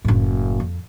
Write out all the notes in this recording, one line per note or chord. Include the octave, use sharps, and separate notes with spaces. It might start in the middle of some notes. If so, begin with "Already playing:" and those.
F#1 A2
F2